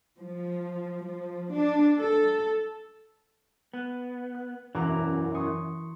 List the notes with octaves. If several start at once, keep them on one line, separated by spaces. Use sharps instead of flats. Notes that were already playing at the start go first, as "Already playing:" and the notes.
F3
F3
D4
A4
B3 F#6
F#6
E1 F#2 E3 A#5 D6
C6 C#6 D#6